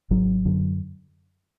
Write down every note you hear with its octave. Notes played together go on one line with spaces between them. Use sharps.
G#1 F#3
F#2 D3